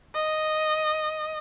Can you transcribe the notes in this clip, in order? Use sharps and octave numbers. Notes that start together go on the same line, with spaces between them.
D#5